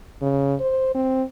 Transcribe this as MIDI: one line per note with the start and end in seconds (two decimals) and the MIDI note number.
0.22 0.55 49
0.60 0.94 72
0.95 1.23 60